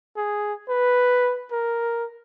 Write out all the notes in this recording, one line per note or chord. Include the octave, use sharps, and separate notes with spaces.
G#4
B4
A#4